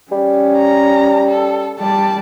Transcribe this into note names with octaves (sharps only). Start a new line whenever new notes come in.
G3 C#4
A#5
A4
G3 D5 A5